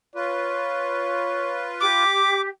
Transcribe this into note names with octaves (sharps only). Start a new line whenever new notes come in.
F4 B4 C#5
G4 D6